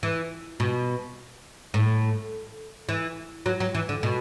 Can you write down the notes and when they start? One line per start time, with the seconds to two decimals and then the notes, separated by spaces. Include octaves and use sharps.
0.03 E3
0.60 B2
1.74 A2
2.89 E3
3.46 F#3
3.60 F#3
3.75 E3
3.89 D3
4.03 B2